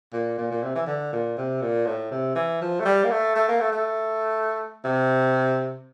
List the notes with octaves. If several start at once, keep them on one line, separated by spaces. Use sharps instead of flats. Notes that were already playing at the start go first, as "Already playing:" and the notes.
A#2
A#2
A#2
C3
E3
D3
A#2
C3
A#2
A2
C3
E3
F3
A3
G3
A#3
A3
A3
A#3
A3
A3
C3